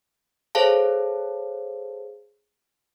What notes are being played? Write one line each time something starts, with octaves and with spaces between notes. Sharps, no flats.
G#4 A4 C5 C#5 F5 A5